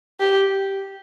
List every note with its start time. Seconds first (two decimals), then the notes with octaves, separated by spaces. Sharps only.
0.20 G4